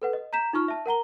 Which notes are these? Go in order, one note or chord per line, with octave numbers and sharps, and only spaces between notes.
A4 B4 F#5
D#5
A#5 G6 B6 E7
D#4 F4 C#6 F6
E5 A5
A#4 F#5 A#5 G7